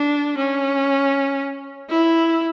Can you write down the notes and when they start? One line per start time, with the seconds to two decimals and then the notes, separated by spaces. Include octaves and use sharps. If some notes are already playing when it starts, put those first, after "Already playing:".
Already playing: D4
0.37 C#4
1.90 E4